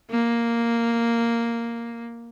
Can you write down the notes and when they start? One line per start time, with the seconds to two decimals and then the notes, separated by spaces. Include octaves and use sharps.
0.10 A#3